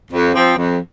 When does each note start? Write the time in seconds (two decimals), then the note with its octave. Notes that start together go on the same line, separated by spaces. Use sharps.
0.11 F2
0.35 F3 C4
0.56 F2